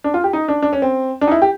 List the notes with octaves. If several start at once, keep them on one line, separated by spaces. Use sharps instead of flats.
D4
F4
G4
D#4
D4
D4
C#4
C4
D4
D#4
E4
G4